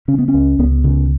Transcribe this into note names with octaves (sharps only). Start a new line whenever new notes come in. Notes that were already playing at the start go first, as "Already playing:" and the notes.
C#3 C#4
B3
C#4
C#2
C#2 B3
C#3